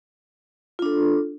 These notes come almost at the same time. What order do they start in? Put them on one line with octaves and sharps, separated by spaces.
F4 D4 A4